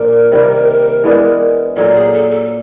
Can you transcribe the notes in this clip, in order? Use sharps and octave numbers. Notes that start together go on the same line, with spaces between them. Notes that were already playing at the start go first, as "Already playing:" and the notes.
Already playing: A#2 F3 A#3 D4 A#4
C3 D#3 G3 A#3
E3 G#3 B3 D4
A#2 F#3 A#3 A4
G#4
A4
A4